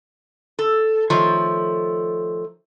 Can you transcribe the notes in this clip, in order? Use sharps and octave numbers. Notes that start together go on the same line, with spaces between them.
A4
D#3 F3 A3 C#5